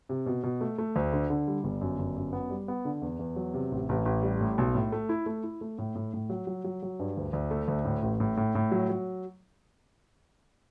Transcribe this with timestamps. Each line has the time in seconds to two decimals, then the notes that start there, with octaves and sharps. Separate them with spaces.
0.09 C3
0.26 B2
0.43 B2
0.61 A3
0.78 A3
0.96 D2
1.13 D3
1.30 D3
1.47 G3
1.64 G1
1.81 F#2
1.98 G1
2.16 F#2
2.33 B3
2.50 G3
2.68 B3
2.85 D3
3.02 E2
3.19 E2
3.36 F#3
3.54 C3
3.71 A1
3.89 A1
4.05 A1
4.22 G3
4.40 A2
4.58 B1
4.75 A2
4.92 A3
5.09 E4
5.26 A3
5.43 E4
5.61 A3
5.78 A2
5.95 A2
6.13 A2
6.30 F#3
6.47 F#3
6.64 F#3
6.83 F#3
6.99 G2
7.17 D2
7.33 D2
7.51 A3
7.68 D2
7.85 A2
8.02 A1
8.20 A2
8.37 A2
8.55 A2
8.71 F#3
8.90 F#3